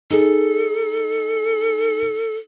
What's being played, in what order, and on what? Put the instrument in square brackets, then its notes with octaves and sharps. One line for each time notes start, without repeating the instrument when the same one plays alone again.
[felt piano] D#4 G#4 [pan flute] A4